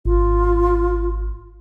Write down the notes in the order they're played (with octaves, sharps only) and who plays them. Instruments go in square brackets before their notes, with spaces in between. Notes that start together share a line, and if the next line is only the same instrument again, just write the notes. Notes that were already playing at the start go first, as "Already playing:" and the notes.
[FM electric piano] G#1 [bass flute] F4